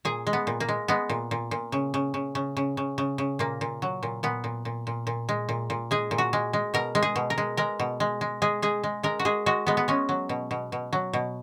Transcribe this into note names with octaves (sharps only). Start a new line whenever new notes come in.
A#2 G#4
G#3
B3
A#2
A#3
G#3
G#3 B3
A#2
A#2
A#2
C#3
C#3
C#3
C#3
C#3
C#3
C#3
C#3
A#2 A#3
A#2
F#3
A#2
A#2 B3
A#2
A#2
A#2
A#2
G#3
A#2
A#2
G#3 G#4
A#2
F#4
G#3
G#3
B2 A#4
G#3
G#4
B2
A#4
G#3
G#3 A#4
B2
G#3
G#3
G#3 G#4
G#3 G#4
G#3
G#3 A#4
F#4
G#3 G#4
G#3 F#4
G#3 B3
B3
G#3 C#4
F#3
B2
B2
B2
F#3
B2